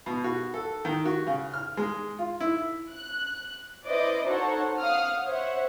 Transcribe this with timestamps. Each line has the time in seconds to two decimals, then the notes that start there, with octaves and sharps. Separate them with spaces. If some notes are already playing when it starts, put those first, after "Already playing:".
0.06 B2
0.24 F#4
0.54 A4
0.85 D#3
1.05 F#4
1.27 C#3
1.54 F6
1.77 G#3
2.19 F4
2.40 E4
2.91 F#6
3.86 E4 B4 C5 D5 D#5 D6
4.27 D#4 F#4 A4 C5 C#5 F#5
4.79 F5 F#5 D#6 F6
5.26 C5 C#5 E5 F#5